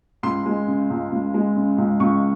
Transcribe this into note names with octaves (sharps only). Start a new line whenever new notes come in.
C#2 C6
G#3
C#3
C#2
C#2
G#3
C#3
C#2
C#2 C#6